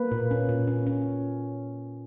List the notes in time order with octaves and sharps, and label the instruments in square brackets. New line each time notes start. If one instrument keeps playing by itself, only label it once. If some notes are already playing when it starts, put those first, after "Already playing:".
Already playing: [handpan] A#3 B4
A#2
C#4
A#2
C#4
C#4